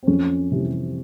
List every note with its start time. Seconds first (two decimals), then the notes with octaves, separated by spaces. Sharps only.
0.03 C4
0.07 F2 C#4
0.51 C3 E3 G3